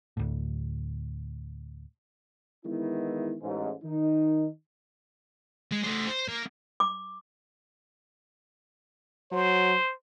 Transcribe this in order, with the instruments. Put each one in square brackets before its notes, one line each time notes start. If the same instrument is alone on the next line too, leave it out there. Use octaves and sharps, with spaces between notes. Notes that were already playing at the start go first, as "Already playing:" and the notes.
[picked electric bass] D2 A2
[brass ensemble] D#3 E3 G#3 B3 E4
A1 G#2
D#3 D#4
[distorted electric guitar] G#3
A3 C5
C5
A#3
[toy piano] D6
[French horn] F#3 [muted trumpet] C5